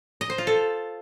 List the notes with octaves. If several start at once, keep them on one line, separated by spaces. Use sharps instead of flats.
D#5
C5
F4
A4